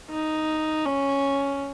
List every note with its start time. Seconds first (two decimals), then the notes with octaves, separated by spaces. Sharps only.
0.11 D#4
0.86 C#4